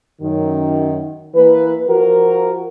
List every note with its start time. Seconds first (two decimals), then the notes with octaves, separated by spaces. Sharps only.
0.21 F#2 D#3
1.35 E3 A#3 B4
1.88 F3 F#4 A#4